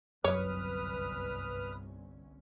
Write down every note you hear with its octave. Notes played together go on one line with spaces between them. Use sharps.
G1 C2 F#2 C#4 B4 C#5 D#6 F6